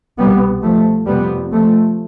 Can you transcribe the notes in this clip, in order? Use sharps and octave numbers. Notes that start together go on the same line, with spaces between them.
C2 B2 G3 B3
F3 A3
F2 C3 G3 B3
F3 A3